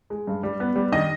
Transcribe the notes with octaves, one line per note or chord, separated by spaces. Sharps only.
G#3
G2
G3
B3
G3
D#3 D#5